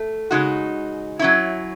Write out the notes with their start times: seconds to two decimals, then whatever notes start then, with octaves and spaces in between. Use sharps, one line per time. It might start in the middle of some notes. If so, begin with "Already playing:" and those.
Already playing: A3
0.31 C#3 G#3 D#4 F#4
1.19 F#3 C#4 E4